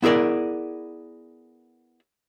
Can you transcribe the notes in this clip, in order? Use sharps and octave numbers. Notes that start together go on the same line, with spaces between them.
B3 E4 G#4 A#4 D5